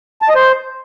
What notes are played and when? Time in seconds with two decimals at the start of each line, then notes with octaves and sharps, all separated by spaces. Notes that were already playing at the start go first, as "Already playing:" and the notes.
0.22 A5
0.29 D#5
0.35 C5